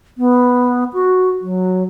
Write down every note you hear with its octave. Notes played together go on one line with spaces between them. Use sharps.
B3
F#4
F#3